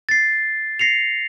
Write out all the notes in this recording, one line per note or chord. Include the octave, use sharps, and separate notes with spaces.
A6 C7
A#6 C7 C#7 F7